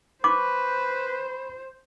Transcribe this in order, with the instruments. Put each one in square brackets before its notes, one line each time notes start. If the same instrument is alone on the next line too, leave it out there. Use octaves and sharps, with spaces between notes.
[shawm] B4 [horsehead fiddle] C5 [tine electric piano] B5 C#6 [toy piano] D6